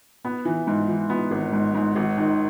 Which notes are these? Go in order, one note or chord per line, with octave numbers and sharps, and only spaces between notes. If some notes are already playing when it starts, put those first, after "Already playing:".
B3
E3
G#2
E3
B3
G#1
G#2
G#2
G#1
D#3